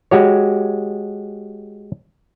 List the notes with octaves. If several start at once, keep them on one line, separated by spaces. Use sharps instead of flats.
G#3 F#4 G4 C#5